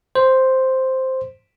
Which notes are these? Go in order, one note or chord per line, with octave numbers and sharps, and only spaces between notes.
C5